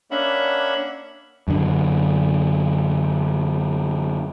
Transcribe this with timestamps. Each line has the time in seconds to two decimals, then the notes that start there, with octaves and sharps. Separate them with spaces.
0.11 A#3 C#4 D4 E5 F#5 B5
1.48 F#2 D3